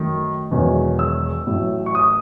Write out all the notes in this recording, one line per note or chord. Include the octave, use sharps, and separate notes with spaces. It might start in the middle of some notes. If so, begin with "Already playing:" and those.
Already playing: F#2 D#3 A3
E1 E2 D#3 F#3 C#4
E6
A1 A2 F#3
C#6
D#6